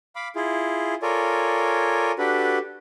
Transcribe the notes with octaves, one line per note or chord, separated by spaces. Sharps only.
F5 B5 D6
E4 F4 G#4
F4 A4 A#4 C#5 D5 G#5
D4 F#4 G4 A4 B4